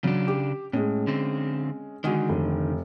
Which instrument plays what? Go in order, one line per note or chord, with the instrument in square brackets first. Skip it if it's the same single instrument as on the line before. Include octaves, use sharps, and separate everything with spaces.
[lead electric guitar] C#3 D4 [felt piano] F#3
[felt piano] G4
[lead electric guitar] A2 [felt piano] G#3 C#4
[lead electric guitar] D3 C4
[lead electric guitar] D3 D#3 [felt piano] G#3 F#4 G#4
[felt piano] F1